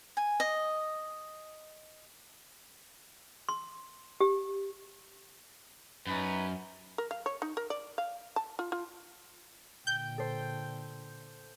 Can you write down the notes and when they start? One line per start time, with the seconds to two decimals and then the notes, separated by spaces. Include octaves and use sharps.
0.17 G#5
0.40 D#5
3.49 C6
4.21 G4
6.07 F#2 C#4 D#4 B4
6.98 A#4
7.11 F5
7.26 C#5
7.42 D#4
7.57 A#4
7.70 D5
7.98 F5
8.36 A5
8.59 F4
8.72 F4
9.87 A#2 D3 G5 G6
10.18 A4 C5